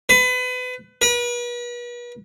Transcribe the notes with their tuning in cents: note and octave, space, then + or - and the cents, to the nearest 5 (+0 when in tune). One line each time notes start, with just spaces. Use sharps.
B4 +30
B4 -40